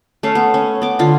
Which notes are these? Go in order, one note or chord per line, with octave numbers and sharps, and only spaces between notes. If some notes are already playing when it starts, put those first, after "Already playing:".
A3 C#4 F5
B3
C#4
B3 D6
D3 F4